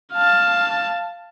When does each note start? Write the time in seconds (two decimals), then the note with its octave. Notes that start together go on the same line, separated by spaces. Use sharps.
0.13 F5 A5